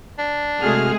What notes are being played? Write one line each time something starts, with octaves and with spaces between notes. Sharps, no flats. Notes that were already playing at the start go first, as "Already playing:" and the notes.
D4
C3 G#3 A3 F#4 G#4 F6